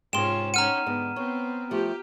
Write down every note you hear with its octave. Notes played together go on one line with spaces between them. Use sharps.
G#2 C3 C#4 F4 G5 C6 E7
C#4 D#4 F#5 A#5 F6 D#7
G#2 D3 B3
B3 C4 C#5
F3 A3 G4